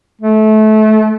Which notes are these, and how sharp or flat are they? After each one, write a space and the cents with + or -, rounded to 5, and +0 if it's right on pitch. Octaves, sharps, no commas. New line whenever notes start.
A3 -25